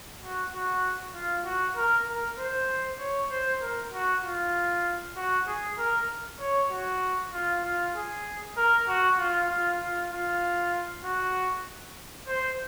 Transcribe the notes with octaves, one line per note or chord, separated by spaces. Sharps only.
F#4
F#4
F4
F#4
A#4
A#4
C5
C#5
C5
A#4
F#4
F4
F#4
G#4
A#4
C#5
F#4
F4
F4
G#4
A#4
F#4
F4
F4
F4
F4
F#4
C5